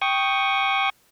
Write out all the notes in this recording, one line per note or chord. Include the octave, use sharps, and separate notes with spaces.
G5 C#6 D#6